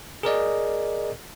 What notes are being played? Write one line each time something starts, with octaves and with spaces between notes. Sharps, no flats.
G#4 A#4 D5 D#5